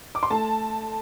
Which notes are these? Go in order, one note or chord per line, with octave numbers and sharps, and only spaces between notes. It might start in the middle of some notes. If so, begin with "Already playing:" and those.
D6
C6
A3 A5